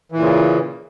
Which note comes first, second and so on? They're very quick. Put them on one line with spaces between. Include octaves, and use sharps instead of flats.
E3 A#2 C#3